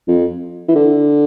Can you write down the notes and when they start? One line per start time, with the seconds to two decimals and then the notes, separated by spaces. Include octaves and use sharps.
0.08 F2
0.68 E3
0.76 D3